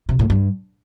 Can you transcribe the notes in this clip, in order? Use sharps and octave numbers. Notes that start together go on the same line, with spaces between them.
C3
A2
G2